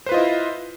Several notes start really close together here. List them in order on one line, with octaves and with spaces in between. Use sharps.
C5 B4 F4 D#5 E4